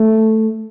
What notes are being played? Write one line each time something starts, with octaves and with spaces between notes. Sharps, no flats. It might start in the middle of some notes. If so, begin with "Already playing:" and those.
Already playing: A3